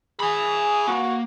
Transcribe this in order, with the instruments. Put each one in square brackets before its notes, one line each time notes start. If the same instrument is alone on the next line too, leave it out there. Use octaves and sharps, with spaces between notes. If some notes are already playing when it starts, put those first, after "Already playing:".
[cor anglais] G#4 [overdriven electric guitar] G#5 B5
[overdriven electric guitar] A#3 [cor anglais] F#4